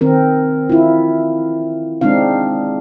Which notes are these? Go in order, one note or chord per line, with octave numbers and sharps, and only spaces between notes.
D#3 C4 A#4
E4 F4
G#3 C4 D4 D#4 F5